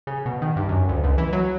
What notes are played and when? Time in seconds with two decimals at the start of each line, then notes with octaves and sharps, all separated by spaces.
0.07 C#3
0.26 B2
0.42 D#3
0.56 G2
0.69 F#2
0.89 D2
1.03 C#2
1.18 E3
1.33 F#3